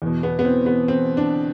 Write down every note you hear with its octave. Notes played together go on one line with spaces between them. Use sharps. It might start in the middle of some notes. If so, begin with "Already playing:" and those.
E2 B2
B3
B3
C4
B3
C4
D4